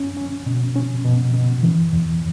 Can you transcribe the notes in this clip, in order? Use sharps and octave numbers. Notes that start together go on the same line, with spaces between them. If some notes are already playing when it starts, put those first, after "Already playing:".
Already playing: C#4
C#4
B2
C#4
B2
B2
E3
E2